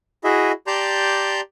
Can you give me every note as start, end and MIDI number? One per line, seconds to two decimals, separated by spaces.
0.24 0.52 64
0.24 0.52 66
0.24 0.52 68
0.24 0.52 75
0.24 0.52 76
0.67 1.41 67
0.67 1.41 74
0.67 1.41 81
0.67 1.41 82
0.67 1.41 84
0.67 1.41 91